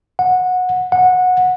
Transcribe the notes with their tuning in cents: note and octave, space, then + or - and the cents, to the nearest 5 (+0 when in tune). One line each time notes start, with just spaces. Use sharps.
F#5 -20
F#5 -20